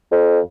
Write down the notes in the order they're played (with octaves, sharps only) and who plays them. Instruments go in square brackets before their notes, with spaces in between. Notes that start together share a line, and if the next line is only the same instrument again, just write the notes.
[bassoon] F2